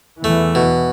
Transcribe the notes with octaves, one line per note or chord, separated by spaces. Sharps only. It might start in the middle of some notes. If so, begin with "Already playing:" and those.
E2 E3 A3
B2